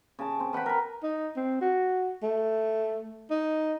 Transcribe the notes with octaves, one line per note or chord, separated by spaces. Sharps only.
C#3 A5
C4
B4 F#5 G5 B5
A#4 B4
D#4
C4
F#4
A3
D#4